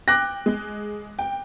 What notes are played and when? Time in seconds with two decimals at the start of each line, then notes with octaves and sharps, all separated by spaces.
0.08 G5 D6 F#6 A#6
0.46 G#3
1.19 G5